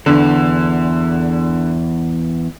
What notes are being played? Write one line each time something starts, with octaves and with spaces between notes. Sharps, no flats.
E2 D3